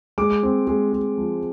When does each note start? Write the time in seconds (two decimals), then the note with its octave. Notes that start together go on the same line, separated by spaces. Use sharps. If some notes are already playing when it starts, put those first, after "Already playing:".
0.18 G#3 D6
0.43 C4
0.67 G#3
0.93 G#3
1.18 F3